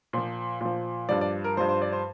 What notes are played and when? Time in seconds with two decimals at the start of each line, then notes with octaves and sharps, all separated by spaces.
0.13 A#2 F3 C5
0.61 A#2 F3
1.09 G2 F3 D5
1.21 D5
1.44 A#4
1.57 G2 F3 C5
1.69 C5
1.82 D5
1.92 C5